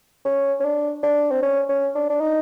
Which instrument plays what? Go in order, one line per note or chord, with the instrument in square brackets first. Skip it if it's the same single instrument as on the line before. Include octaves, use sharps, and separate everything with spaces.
[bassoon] C#4
C#4
D4
D4
C4
C#4
C#4
D4
D4
D#4